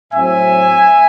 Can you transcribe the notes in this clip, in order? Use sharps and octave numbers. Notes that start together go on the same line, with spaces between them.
A2 F#3 C4 E5 G#5